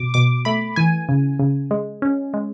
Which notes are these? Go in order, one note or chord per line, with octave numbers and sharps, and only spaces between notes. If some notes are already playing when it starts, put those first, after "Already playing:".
Already playing: B2 D6
B2 D6
A3 B5
E3 G#5
C#3
C#3
G#3
C#4
G#3